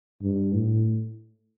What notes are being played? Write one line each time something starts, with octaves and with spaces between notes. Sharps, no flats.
G2
A2